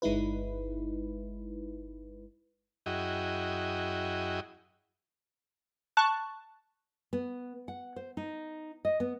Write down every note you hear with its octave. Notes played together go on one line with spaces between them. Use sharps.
G1 G#3 D#4 E4 B4
F#2 E4 F#4 G#4 D#5 G5
A5 C#6 F#6
B3
F#5
C5
D#4
D#5
B3